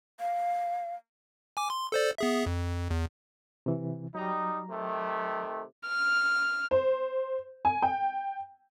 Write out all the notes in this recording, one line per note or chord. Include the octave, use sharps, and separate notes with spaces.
F5
G#5 D6
C6
A4 C5 D5
B3 G#4 E5
F2
E2
C3 E3
F#3 G3 D#4 A#5
C3 D#3 A3
F6
C5
G#5
G5